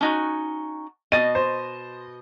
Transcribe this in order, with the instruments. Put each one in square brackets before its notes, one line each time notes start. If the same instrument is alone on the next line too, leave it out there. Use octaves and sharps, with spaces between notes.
[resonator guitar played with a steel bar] C#4 D#4 F#4
[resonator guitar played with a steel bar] B2 D#5 [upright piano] A6 D#7
[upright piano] C5